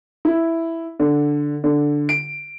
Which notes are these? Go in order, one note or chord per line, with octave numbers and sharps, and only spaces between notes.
E4
D3
D3
D7